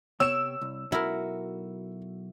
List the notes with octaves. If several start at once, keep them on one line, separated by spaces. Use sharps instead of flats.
C3 B3 C#5 G5 E6 E7
C2
B1 E4 F#4 A#4